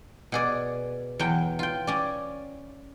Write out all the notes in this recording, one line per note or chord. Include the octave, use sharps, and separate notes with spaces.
B2 G#4 D5
E2 F#3 G5
F4 G5
C#4 D5